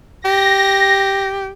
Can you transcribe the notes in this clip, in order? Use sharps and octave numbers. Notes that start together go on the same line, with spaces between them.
G4 A#6